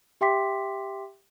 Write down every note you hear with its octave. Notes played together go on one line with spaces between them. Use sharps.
G4 E5 G5 C6 D6 B6